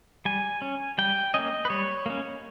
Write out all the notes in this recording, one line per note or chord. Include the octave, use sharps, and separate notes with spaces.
G3 G#5
C#4
G3 G5
A#3 C#4 D#5
B4
G3 C#5
A#3 C#4